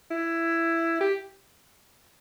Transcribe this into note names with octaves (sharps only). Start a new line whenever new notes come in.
E4
G4